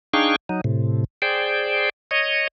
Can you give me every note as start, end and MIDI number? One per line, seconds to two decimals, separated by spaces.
0.13 0.36 62
0.13 0.36 63
0.13 0.36 68
0.13 0.36 77
0.13 0.36 79
0.13 0.36 85
0.49 0.61 54
0.49 0.61 63
0.64 1.04 45
0.64 1.04 48
1.22 1.89 68
1.22 1.89 72
1.22 1.89 74
1.22 1.89 79
2.11 2.48 73
2.11 2.48 75